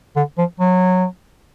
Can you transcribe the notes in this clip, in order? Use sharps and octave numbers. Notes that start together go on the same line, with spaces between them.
D3
F3
F#3